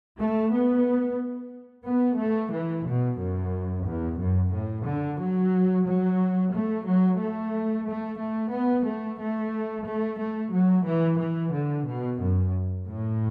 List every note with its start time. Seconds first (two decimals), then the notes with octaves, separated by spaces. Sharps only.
0.19 A3
0.53 B3
1.86 B3
2.19 A3
2.53 E3
2.86 B2
3.20 F#2
3.86 E2
4.19 F#2
4.53 A2
4.87 D3
5.20 F#3
5.86 F#3
6.54 A3
6.87 F#3
7.20 A3
7.86 A3
8.21 A3
8.53 B3
8.86 A3
9.21 A3
9.87 A3
10.20 A3
10.54 F#3
10.87 E3
11.20 E3
11.54 D3
11.88 B2
12.21 F#2
12.87 A2